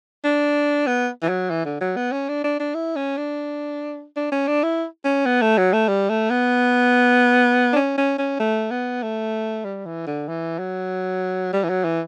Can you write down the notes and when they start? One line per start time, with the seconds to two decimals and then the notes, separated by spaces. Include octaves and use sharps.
0.24 D4
0.87 B3
1.22 E3
1.28 F#3
1.50 E3
1.65 D3
1.81 F#3
1.96 B3
2.12 C#4
2.28 D4
2.44 D4
2.59 D4
2.74 E4
2.96 C#4
3.17 D4
4.16 D4
4.32 C#4
4.47 D4
4.63 E4
5.05 C#4
5.26 B3
5.42 A3
5.57 F#3
5.73 A3
5.88 G3
6.09 A3
6.30 B3
7.73 D4
7.76 C#4
7.98 C#4
8.18 C#4
8.39 A3
8.71 B3
9.02 A3
9.65 G3
9.86 E3
10.07 D3
10.28 E3
10.59 F#3
11.53 G3
11.64 E3
11.69 F#3
11.84 E3